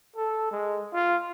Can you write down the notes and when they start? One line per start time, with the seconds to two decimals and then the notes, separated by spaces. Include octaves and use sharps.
0.16 A4
0.52 G#3
0.94 F4